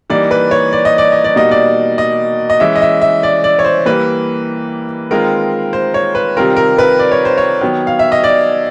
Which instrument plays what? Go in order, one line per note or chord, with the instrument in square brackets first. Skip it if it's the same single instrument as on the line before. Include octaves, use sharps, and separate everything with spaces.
[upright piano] E3 G3 A#3 D#4 D5
B4
C#5
D5
D#5
D5
D#5
D5
B2 G3 A#3 D#4 D#5
D5
D#5
D#5
E3 G#3 C#4 E5
D#5
E5
E5
D5
D5
C#5
C5
E3 G3 A#3 B4
D#3 G#3 C4 F4 A#4
C5
C#5
B4
C3 D#3 G3 C4 F4 A#4
A#4
B4
D5
C#5
C5
C#5
D#3 F#3 B3
F5
E5
D#5
D5